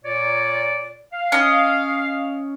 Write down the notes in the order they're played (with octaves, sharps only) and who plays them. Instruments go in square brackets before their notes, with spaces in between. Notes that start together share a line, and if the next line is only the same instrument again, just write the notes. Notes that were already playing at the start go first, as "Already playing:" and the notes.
[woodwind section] A#2 C#5 D5
F5
[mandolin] C#4 D#5